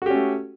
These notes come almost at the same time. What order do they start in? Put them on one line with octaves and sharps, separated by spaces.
F#4 G4 C#4 A3